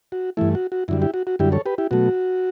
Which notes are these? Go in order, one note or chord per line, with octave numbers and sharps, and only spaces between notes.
F#4
G2 E3 A3 E4
F#4
F#4
F#2 D3 G3 E4
E4 G4
F#4
F#4
F#2 D3 G3 E4 G4
A4 C#5
G4 B4
E4 G4
B2 F#3 A3 F#4